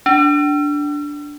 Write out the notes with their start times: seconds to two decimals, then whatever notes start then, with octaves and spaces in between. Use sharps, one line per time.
0.06 D4